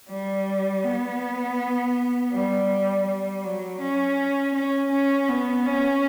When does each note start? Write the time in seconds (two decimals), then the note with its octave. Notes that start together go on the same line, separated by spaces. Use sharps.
0.10 G3
0.84 B3
2.32 G3
3.06 G3
3.43 F#3
3.80 C#4
4.54 C#4
4.91 C#4
5.28 B3
5.65 C#4